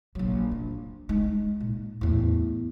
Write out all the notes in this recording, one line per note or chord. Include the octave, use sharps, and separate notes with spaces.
A#1 F#3
D4
G#3 D#4
A#2
E2 A2